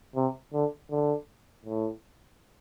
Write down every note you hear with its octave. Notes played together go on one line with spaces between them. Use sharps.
C3
D3
D3
A2